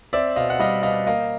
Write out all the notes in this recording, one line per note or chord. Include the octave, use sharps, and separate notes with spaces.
C4 D5 E5
B2 D#5 F5
F#5
G3 D#5 F5
B2 D#5 F5
A#3 D#5 F5